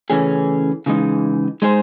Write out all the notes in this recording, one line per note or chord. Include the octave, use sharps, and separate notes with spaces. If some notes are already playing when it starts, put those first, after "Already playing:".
C#3 E3 A3 C#4 G#4
C#3 E3 G#3 D#4
G#3 D#4 G#4 C5